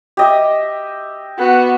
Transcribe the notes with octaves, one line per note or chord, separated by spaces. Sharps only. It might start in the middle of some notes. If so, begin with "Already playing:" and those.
G4 D#5 E5
B3 F#4